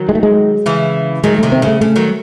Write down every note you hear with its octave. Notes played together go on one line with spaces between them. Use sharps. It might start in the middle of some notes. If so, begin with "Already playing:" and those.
Already playing: D#3 F#3
G#3
A3
G#3
C#3 E3
D#3 F#3 G#3
C3 D#3 A3
C4
C#3 A3
C#3 A3
D#3 F#3